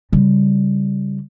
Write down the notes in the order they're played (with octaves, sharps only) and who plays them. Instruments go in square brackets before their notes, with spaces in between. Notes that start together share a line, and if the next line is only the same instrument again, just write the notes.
[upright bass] C#3 G3